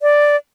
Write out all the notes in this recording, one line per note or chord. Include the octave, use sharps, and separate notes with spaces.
D5